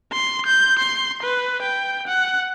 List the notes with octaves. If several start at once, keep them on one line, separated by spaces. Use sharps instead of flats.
C6
G6
C6
B4
G5
F#5